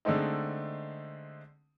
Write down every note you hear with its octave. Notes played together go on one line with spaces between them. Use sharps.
D3 G#3 A3 C4 D#4